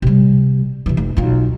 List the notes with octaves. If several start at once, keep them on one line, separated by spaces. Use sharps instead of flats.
C3 G3
C3 E3
F1
B1 F4